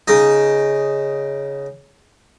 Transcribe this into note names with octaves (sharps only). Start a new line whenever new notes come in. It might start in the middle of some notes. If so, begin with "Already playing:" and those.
C#3 D#4